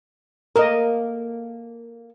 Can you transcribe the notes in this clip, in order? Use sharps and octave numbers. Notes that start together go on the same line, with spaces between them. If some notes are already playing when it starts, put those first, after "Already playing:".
A#3 A4 A#4 D#5